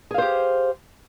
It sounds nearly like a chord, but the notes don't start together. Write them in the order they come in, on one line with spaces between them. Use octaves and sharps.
G#4 F5 C5 G4